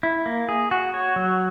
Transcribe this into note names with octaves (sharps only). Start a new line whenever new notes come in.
E4
A#3
G#4
F#4
C#5
F#3